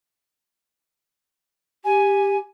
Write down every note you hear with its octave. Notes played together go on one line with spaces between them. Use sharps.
G4 G#5